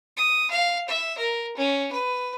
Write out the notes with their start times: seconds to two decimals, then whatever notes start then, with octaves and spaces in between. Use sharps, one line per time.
0.17 D#6
0.51 F5
0.88 E5
1.18 A#4
1.57 C#4
1.92 B4